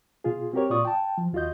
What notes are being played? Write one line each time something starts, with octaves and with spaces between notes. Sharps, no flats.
B2 F4 G#4
C4 F#4 G4 A#4 C#5
A#2 F4 D5 C#6 D#6
G5 A5
F3
D#2 F4 F#4 D#5 G6